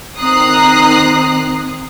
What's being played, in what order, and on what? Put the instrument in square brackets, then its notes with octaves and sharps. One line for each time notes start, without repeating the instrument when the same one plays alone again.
[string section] D#3 C4 A#5 D#6 F#6 C7